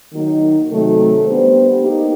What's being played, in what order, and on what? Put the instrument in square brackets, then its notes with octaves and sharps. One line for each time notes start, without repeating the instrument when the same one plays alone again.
[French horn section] D#3 F#3 A#3 D#4
C3 D#3 F#3 A3
G3 B3 D4 G4 C5
A#3 D#4 G4